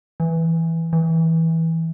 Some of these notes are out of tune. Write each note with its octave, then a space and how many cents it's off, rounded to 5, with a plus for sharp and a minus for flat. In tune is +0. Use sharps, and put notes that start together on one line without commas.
E3 +0
E3 -15